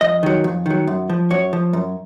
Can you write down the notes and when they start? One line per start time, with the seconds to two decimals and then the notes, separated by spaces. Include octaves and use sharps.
0.01 F2 D#5
0.23 D#3 F#3
0.44 F2
0.66 D#3 F#3
0.87 F#2
1.09 F3
1.30 F#2 C#5
1.53 F3
1.73 F#2